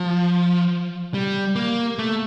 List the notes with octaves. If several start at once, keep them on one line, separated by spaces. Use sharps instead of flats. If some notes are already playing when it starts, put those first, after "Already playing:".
Already playing: F3
G3
A#3
A3